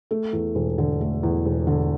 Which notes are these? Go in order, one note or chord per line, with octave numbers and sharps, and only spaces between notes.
A3
E2
E1
D3
A3
E2
E1
D3